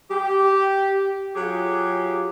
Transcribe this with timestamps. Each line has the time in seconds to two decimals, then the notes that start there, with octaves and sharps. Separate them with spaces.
0.11 G4
1.36 F#3 F4 G4 G#4